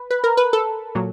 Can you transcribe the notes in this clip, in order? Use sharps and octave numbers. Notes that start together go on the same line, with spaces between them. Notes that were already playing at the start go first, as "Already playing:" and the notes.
Already playing: B4
B4
A#4
B4
A4
A#2 F#3